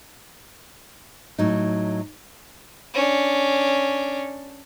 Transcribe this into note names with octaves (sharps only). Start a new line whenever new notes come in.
A2 F#3 D#4
C#4 D4